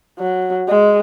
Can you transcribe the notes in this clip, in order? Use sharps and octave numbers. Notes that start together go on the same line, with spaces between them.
F#3
G#3